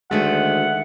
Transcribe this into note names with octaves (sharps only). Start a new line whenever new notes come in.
D2 D#3 G#3 A3 A4 F#5